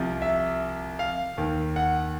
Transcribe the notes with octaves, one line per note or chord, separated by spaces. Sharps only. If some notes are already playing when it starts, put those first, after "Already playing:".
Already playing: C2 C3 F3
E5
F5
D#2 D#3
F#5